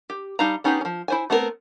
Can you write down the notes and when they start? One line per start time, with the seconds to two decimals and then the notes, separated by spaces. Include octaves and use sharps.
0.10 G4
0.39 G3 D#4 F5 A5 A#5
0.64 B3 C#4 D#4 G4 G#4
0.81 F3 C#4
1.08 E4 C5 G#5
1.30 A3 B3 C4 F#4 A#4